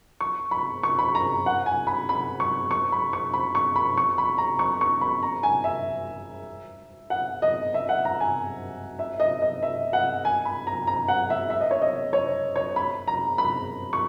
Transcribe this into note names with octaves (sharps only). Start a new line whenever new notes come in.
C#6
B5
C#6
B5
A#5
F#5
G#5
B5
B5
C#6
C#6
B5
C#6
B5
C#6
B5
C#6
B5
A#5
C#6
C#6
B5
A#5
G#5
E5
F#5
D#5
E5
F#5
A#5
G#5
E5
D#5
D#5
E5
F#5
G#5
B5
A#5
A#5
F#5
E5
E5
D#5
C#5
D#5
C#5
C#5
B5
A#5
B5
C#6